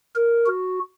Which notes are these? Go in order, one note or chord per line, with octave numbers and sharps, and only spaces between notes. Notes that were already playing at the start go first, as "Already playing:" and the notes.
A#4
F#4